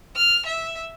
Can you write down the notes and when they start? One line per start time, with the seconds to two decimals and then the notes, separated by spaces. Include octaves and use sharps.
0.16 F6
0.46 E5